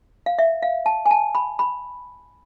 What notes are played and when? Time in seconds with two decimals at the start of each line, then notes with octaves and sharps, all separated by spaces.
0.26 F5
0.39 E5
0.62 F5
0.86 A5
1.06 G#5
1.11 A5
1.35 B5
1.59 B5